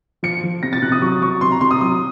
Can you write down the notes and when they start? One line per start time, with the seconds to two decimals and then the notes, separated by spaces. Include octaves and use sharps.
0.23 F3 C#7
0.44 F3
0.63 C3 A#6
0.73 A6
0.82 C3 F#6
0.92 D#6
1.02 F#3 C#6
1.22 F#3 C#6
1.41 C3 C6
1.52 A#5
1.61 C3 C6
1.71 D#6
1.81 F#3 D#6